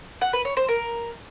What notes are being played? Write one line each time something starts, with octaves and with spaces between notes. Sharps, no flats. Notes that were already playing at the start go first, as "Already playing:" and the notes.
F#5
B4
C#5
C5
A#4